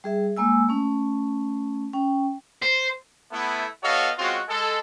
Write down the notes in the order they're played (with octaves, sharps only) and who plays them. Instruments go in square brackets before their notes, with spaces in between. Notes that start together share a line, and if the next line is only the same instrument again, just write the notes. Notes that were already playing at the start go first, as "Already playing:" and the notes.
[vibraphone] G3 G#4 E5
G#3 A#3 G#5 E6
A3 C#4
C#4 G5
[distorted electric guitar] C5
[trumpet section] A3 B3 E4
B3 F#4 A4 C#5 D#5 F5
G#3 C4 C#4 F4 F#4
G#3 A4